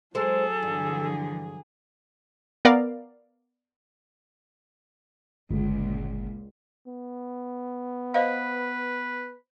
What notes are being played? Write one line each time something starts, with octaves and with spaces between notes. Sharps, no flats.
F#3 G#3 G#4 A4 C5
G2 D3 E3 F3
B3 A#4 D5 F5
G1 C#2 A#2
B3
B4 C5 D#5 F5